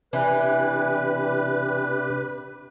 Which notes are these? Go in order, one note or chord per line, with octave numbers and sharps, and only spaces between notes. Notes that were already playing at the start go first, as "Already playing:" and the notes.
C3 E3 D4 G4 B4